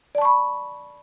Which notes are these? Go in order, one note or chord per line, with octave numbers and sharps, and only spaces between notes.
D5 A5 B5 C#6